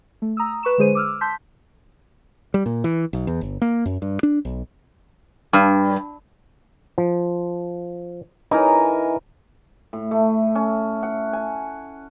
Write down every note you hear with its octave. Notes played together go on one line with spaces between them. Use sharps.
A3
A#5 D#6 E6
B4 C#6 E7
D3 G#3 G#4 C5 D#7
D6 E6 F6
A5 C6 G6 B6
G3
A#2
E3
B1
E2
G1
A#3
F#2
G2
D4
B1
G2
F3
E3 D#4 A#4 G#5
A2
A3
C#4
F#5
G#5